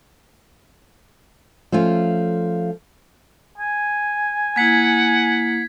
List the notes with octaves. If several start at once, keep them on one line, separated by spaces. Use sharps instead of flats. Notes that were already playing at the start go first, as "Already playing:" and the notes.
F3 A3 C#4 F4
G#5
A#3 E4 F#5 G#6 B6